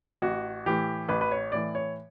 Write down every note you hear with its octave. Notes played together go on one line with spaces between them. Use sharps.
A1 F#4
A2 E3 G4
A1 B4
B4
C#5
A2 E3 D5
C#5